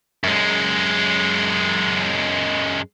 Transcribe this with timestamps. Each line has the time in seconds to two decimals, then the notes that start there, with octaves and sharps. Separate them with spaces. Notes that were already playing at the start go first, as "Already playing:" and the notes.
0.24 F#2 G#3